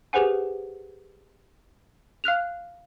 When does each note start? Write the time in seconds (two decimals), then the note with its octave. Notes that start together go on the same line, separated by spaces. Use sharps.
0.13 G4 G#4 B4 C5 F#5 G#5
2.24 F5 F6 F#6 F7